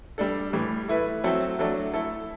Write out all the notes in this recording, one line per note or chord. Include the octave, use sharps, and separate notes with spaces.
G3 D4 A4
A2 E3 G3
A3 E4 B4
F#3 A3 C4 E4 A4
F#3 A3 D4 F#4 A4
A3 E4 A4